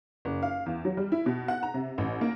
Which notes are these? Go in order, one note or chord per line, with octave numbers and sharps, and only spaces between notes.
F#1
F5
E2
F#3
G3
E4
B2
F#5
A#5
C3
A1
A#3